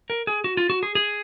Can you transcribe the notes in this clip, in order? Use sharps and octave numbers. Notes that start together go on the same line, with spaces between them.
A#4
G#4
F#4
F4
F#4
G#4
G#4